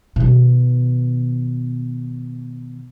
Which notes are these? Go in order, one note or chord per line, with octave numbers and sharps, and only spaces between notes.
B2 D#3